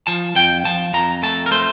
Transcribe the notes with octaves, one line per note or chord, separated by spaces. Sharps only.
F3 A5
F2 G5
F3 A5
F2 A#5
A3 A5
A#4
A3 C5